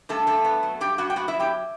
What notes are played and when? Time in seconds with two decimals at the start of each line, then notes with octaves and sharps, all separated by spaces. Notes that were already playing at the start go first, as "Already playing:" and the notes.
0.09 G2 A3 A4
0.27 G2 A3 A4
0.45 B3
0.63 F#3
0.81 G2 G4 G5
0.98 G2 F#4 F#5
1.10 G5
1.16 B3 F#4 F#5
1.28 E4 E5
1.34 F#3
1.40 G4 G5